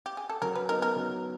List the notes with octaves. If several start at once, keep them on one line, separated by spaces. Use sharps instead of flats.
G4
G#4
A4
F#3 A#4
B4
B3 D#4 A#4
A#4
F#3